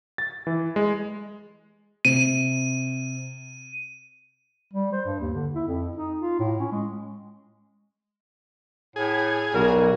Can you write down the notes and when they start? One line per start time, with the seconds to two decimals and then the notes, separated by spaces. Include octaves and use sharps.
0.18 A6
0.47 E3
0.76 G#3
2.05 C3 D#7
4.74 G3
4.93 C5
5.05 G2
5.20 D#2
5.35 D3
5.55 E4
5.68 F2
5.97 D#4
6.21 F4
6.40 A2
6.60 C#4
6.72 G#3
8.96 A2 G#4
9.54 B1 G3 F#4 A#4